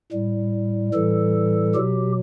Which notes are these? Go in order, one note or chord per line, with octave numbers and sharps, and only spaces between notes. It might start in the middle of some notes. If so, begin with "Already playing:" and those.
A2 G3
A2 E3 G3 A4
B2 F#3 G4